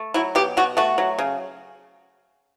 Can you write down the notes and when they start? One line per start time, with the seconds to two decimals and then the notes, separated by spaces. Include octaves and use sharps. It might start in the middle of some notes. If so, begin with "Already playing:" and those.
Already playing: A3
0.14 F#3 E4
0.35 B2 G4
0.57 B2 F#4
0.77 A3 F#4
0.98 F#3
1.18 C#3